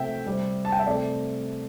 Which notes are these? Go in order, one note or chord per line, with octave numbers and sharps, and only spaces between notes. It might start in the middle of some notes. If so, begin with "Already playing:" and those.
Already playing: C3 A3 C4 E5 G5
C3 G3 C4
A5
G5
E5
C3 A3 C4 D5